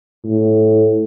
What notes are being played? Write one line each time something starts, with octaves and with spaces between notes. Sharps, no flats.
A2